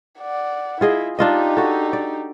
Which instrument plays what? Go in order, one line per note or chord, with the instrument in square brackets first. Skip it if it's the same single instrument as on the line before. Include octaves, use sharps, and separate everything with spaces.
[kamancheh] D5 F#5
[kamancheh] E4 [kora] F4 G#4 D#5
[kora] D4 F4 D#5 [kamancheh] D#4 G4
[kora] F#4 A4
D5